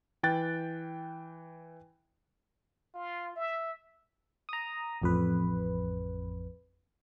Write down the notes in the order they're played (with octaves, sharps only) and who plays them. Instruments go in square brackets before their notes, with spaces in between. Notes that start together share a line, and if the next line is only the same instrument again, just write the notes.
[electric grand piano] E3 G5 F#6 A6
[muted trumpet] F4
E5
[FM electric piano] A#5 D#6
A1 F2 B4